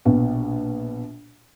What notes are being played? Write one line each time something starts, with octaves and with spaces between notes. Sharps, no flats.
A#1 B2